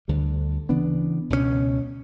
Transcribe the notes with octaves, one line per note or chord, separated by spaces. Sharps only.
D2 D3 G3
C#3 E3 B3 D4
C#2 B2 A3 C#4